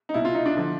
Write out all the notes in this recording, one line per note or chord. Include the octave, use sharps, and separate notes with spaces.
D#4
C2 B2 E4
F4
D#4
D4
D3 F3